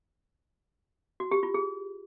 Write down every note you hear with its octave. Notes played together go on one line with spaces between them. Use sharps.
F#4
G4
F4
G#4